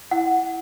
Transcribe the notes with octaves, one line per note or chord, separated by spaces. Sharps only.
E4 F#5